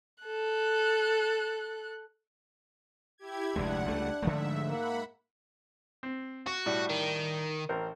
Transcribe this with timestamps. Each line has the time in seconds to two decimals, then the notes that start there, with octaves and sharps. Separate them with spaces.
0.24 A4 F#6
3.18 E4 G4 G#6
3.56 F1 D2 G#3 D4 F#5
3.88 C#2 G3 A3
4.22 G#2 D3 F3 A3 E5
4.69 A#3 F#5 B5
6.03 C4
6.46 F#4 C#6
6.66 A2 G3
6.89 D#3
7.69 A1 A#4 C5